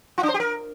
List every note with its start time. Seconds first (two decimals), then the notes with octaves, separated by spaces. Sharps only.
0.18 F4
0.23 D4
0.29 C5
0.34 G4
0.40 A#4